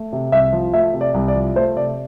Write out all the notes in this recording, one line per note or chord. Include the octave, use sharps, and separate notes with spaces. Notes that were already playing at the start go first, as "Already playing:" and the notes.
Already playing: A3
C3
C2 E5
F3
A3 E5
C3
D5
C2
D5
F3
A3 C5
C3 D5